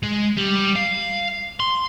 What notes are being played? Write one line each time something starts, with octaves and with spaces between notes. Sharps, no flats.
G#3
G3
F5
C6